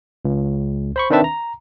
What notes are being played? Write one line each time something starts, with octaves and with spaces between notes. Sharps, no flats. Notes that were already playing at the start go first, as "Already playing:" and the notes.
C#2
C5 B5 C#6
D#3 C4 D4 B4 E5 A5
A#5